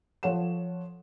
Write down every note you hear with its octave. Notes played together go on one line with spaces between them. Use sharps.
F3 A4 C#5 F#5 E7